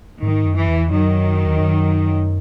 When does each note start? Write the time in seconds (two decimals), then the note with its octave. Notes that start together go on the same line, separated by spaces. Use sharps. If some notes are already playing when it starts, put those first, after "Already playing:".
0.22 G#2 D#3
0.45 F#2
0.57 E3
0.68 E2
0.91 F#2 D#3 F#3
1.46 E2
1.60 F#2